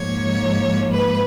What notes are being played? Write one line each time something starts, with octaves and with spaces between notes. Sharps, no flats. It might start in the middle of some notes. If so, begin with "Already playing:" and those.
Already playing: G#2 F3 A#3 C#5
B4